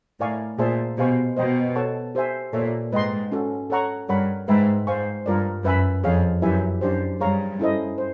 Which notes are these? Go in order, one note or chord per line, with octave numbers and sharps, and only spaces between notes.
A2 A#4 D5 F5 G#5 C#6
A#2 G#4 C5 E5 A5 C6
B2 G4 C5 F5 G#5 C#6
B2 C5 D#5 G5
A4 C#5 F#5 A5 C#6
G4 C5 E5 G#5
A#2 A4 C#5 E5
G#2 B4 D#5 G5 C6
C#4 F#4 A4
A4 C#5 F#5 A#5 C#6
G2 A#4 C#5 F#5 B5
G#2 B4 E5 G5 B5
G#2 C5 F5 G#5 C#6
G2 F4 A#4 D5
F#2 B4 E5 G#5 B5
F2 G#4 C#5 F5
F#2 E4 G4 B4 E5 G#5
F#2 D4 G4 C5
G2 G#4 C#5 F5 A#5 C#6
C#4 E4 A4 C5 D#5
C5